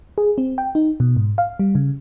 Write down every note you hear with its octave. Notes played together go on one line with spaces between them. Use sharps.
G#4
C4
G5
D#4
B2
G#2
F5
G3
C#3